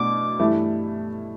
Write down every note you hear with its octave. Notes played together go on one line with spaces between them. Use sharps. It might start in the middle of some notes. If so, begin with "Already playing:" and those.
Already playing: B2 A3 D4 D6
G2 E3 A3 E4